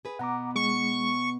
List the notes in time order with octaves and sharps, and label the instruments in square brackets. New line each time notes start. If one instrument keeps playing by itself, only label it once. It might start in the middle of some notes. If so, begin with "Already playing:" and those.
[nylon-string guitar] G#4 B4
[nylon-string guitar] B2 B3 [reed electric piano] F#5 A#5 D6
[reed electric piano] G#3 [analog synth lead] C#6